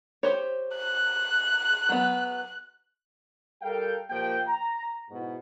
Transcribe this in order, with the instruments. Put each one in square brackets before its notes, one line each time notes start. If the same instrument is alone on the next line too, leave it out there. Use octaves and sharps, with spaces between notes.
[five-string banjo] G4 C5 C#5
[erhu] F#6
[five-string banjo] F#3 B3
[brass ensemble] G3 A4 A#4 F5 G5
A#2 F3 A#3 G4 G5
A#5
G#2 B2 E4 F#4